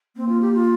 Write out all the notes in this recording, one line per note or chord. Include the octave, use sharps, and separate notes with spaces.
A#3 C4
F4
G4
F4